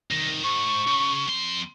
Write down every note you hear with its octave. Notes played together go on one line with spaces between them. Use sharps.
C2 D#3 A#6
G#2 C#6
C#3
F2 C6